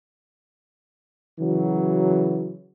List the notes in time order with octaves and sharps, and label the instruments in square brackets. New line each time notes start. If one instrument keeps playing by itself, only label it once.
[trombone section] C#3 E3 F#3